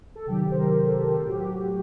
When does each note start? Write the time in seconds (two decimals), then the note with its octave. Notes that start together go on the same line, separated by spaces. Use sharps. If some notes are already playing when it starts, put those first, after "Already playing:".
0.15 A4
0.27 C3 D#3 F#3 G4
0.51 C5
0.57 A#4
0.86 A4
1.14 A2 F#3 A4
1.22 G4
1.29 F#4
1.36 G4